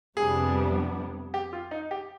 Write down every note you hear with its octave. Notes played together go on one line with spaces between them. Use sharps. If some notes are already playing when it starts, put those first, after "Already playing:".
F2 C3 G3 B3 D4 G#4
G4
F4
D#4
G4